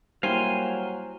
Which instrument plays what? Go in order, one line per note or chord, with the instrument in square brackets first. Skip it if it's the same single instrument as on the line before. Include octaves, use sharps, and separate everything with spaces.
[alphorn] F#3 [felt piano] G3 A#3 E4 [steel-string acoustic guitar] C5 [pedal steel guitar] F5 G#5